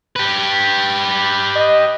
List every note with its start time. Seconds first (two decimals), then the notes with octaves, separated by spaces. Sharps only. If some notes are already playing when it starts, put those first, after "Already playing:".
0.16 G4 B4
1.56 D#5